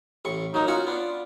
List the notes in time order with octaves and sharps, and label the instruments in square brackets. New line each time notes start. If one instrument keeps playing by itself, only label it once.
[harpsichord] A1 A2 C#6
[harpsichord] F#3 A#3 [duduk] D#4
[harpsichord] C#4 F#4 F#5 [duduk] F4
[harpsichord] B3 D4